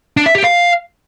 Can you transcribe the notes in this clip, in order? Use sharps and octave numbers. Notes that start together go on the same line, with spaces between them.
D4
E5
G4
F5